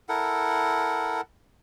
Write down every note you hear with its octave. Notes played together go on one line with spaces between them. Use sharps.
E4 A4 A#4 F#5